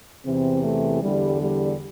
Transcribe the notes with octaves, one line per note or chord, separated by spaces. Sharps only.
E2 C3 E3 C4
A3
E2 D3 G3
G3